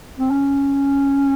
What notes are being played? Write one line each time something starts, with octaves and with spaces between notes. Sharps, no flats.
C4
C#4